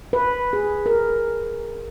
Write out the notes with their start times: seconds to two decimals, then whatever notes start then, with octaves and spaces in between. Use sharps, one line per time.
0.13 B4
0.53 G#4
0.86 A#4